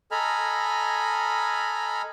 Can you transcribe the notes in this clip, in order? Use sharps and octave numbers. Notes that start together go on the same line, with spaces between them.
A4 D#5 G#5 A#5 B5 F6